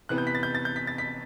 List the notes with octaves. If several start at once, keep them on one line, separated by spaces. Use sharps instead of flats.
C3 E3 B3 F#6
G6
B6
A6
G6
A6
G6
B6
A6
B6